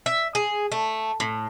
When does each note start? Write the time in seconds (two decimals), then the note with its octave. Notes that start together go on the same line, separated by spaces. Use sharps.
0.06 E5
0.35 G#4
0.72 A3
1.20 A2